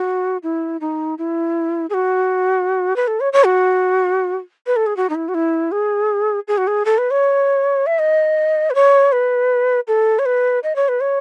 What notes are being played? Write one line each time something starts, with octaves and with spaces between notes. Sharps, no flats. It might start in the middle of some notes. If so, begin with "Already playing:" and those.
Already playing: F#4
E4
D#4
E4
G#4
F#4
B4
A4
C#5
C#5
F#4
B4
A4
G#4
F#4
D#4
E4
F#4
E4
G#4
G#4
F#4
G#4
A4
B4
C#5
E5
D#5
B4
C#5
B4
A4
C#5
B4
D#5
C#5
B4
C#5